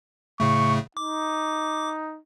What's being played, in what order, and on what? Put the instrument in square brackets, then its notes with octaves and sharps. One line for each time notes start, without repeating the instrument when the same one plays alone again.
[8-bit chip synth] A2 C#3 A3 [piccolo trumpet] C#6
[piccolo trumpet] D#4 [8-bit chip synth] D6